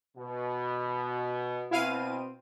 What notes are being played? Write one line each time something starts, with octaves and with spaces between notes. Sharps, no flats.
B2
B2 C4 E4 F5 D#7